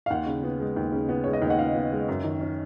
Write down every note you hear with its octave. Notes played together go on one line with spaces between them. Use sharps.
F5
D#2 F#5
C#3
B3
G#3
D#2
C#3
B3
G#3 C#5
D#5
D#2
F#5
C#3 F5
B3
G#3
F#2
D#3
C#4